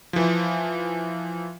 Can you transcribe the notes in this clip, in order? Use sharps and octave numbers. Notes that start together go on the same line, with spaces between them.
E3 F3